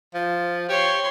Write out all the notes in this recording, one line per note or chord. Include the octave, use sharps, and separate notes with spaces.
F3
G4 C#5 C6